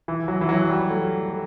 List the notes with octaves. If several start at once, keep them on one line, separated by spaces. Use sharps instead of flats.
E3
F#3
E3
F#3
G3
A3
A3